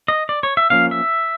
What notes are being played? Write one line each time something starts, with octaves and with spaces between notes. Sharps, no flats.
D#5
D5
C#5
E5
F3 A#3 C#4 F5
E5